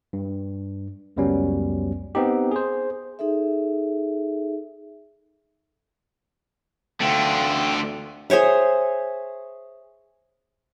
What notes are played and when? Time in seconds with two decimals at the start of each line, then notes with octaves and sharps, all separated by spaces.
0.13 G2
1.17 C#2 F#2 F#3 G3 B3 C#4
2.15 B3 C4 D#4 G4
2.51 G#4 C5
3.19 D#4 G#4 A4 E5
7.01 D2 D3 A3 F4 G5
8.30 G#4 C5 C#5 E5